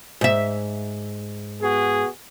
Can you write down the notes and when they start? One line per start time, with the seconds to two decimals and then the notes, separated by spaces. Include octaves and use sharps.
0.21 G#2 E5
1.62 B3 F#4 G#4